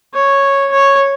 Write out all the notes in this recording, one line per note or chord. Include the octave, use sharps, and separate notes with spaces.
C#5
C#5